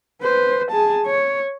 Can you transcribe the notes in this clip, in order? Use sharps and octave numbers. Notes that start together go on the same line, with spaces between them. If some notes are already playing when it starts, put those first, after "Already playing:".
B4 C5
G#4 A5
C#5